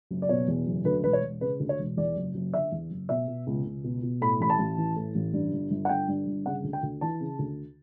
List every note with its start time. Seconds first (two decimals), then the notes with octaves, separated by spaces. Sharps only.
0.11 F#1
0.22 D5
0.29 B2 C#5
0.48 E2
0.67 F#1
0.85 D2 B4
1.04 E1 B4
1.13 C#5
1.23 E1
1.41 C#3 B4
1.60 D2
1.69 C#5
1.79 E1
1.97 E2 D5
2.16 F#1
2.35 F#1
2.53 D3 E5
2.72 E2
2.90 F#1
3.09 B2 E5
3.28 B2
3.47 C#2
3.66 C#2
3.84 B2
4.03 B2
4.21 A2 B5
4.40 A1 B5
4.50 A5
4.59 A1
4.78 E3
4.96 A2
5.15 A1
5.33 G2
5.52 G1
5.71 G1
5.85 F#5
5.89 D3 G5
6.08 G2
6.27 G1
6.46 C#3 F#5
6.64 D2
6.73 G5
6.83 D2
7.01 E3 A5
7.20 C#3
7.39 D2